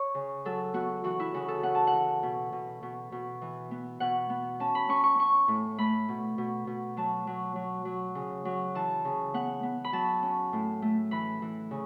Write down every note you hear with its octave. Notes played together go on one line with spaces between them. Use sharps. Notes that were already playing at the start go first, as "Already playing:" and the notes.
Already playing: C#5
C#3
F#3 A4
B3 F#4
E3 F#4
E4
C#3 F#4
A4
C#4 F#5
A5
F#5
E3
B2
B2
B2
B2
E3
B3
B2 F#5
B3
C#4 A5
B5
C#4 C#6
C#6
C#4 C#6
A2
A3 B5
B2
B2
B2
F#3 A5
F#3
F#3
F#3
C#3
F#3
E3 A5
C#3
B3 F#5
B3
B5
F#3 A5
C#4
A2
A3
E3 B5
E3
C#3